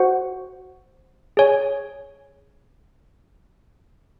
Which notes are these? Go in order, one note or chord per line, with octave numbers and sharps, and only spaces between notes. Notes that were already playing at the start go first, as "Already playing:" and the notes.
Already playing: F#4 C5 F#5
G#4 C#5 G#5